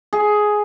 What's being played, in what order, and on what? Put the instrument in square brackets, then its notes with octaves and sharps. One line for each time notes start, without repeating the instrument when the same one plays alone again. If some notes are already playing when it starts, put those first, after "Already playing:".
[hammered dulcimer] G#4